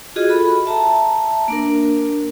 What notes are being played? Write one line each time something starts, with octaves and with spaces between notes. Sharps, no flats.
F4 F#4 G#4 D#5
A4 B5
E5 A5 A#5
A#3 D4 A#4